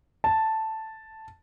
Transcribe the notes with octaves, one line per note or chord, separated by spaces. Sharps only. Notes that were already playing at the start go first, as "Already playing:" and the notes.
A5